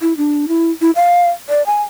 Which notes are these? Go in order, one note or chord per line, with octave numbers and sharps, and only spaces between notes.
E4
D4
E4
E4
F5
D5
G#5